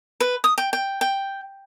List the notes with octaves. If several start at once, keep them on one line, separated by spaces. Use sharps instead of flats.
B4
D#6
G5
G5
G5